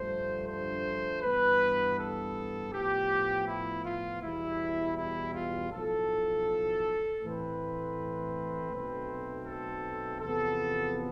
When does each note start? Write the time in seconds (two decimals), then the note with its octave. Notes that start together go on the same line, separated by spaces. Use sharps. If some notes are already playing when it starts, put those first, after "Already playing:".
Already playing: G2 D3 F3 A3 C5
0.48 C5
1.23 G2 E3 B3 B4
1.99 A4
2.72 A2 F3 B3 G4
3.48 E4
3.86 F4
4.22 E2 B2 G3 E4
4.98 E4
5.35 F4
5.72 B1 A2 F3 A4
7.22 A2 E3 A3 C4 B4
8.72 B1 B2 A3 C4
9.46 A4
10.21 E2 C3 F3 B3 A4